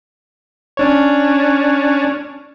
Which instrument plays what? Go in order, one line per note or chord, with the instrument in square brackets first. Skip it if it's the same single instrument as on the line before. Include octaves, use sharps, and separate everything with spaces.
[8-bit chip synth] C#4 D4 C#5